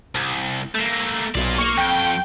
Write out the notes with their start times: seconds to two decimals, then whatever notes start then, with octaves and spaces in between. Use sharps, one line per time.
0.15 C2
0.75 A3 A#3
1.35 B1 F4 D5
1.58 A#3 C#6
1.78 F2 G5